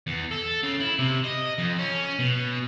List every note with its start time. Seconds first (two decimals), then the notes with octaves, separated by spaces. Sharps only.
0.07 E2
0.31 A4
0.63 C#3
0.80 E4
0.99 C3
1.24 D#5
1.58 F2
1.79 C#4
2.19 B2